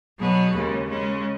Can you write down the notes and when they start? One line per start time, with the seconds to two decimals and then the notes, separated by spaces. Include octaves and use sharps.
0.19 B2 F#3 B3 G#4 B4
0.55 D#2 C#3 G#3 C#4
0.88 C#3 G#3 C#4